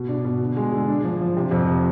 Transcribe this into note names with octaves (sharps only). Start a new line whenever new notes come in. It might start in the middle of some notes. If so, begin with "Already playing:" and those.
Already playing: B2
D4
B2
D3
G#3
D3
D4
F3
F3
C3
F2
C3